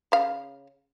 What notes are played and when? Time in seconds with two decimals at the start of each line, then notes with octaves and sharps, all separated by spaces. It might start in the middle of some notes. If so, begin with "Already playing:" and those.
0.12 C#3 F5